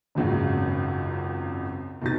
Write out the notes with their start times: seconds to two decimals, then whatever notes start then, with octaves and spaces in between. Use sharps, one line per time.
0.15 G#1 C#2 F#2 C#3
2.02 F1 B2 D#4 A6